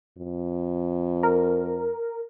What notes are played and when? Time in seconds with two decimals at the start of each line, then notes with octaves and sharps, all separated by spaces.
0.17 F2
1.23 A#4